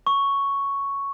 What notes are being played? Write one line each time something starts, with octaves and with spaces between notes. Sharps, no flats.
C#6